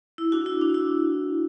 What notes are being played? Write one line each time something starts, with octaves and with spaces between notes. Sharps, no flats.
E4
D4 F#4
E4
D4
E4